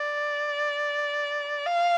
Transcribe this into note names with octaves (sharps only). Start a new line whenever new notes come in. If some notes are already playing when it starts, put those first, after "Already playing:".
Already playing: D5
F5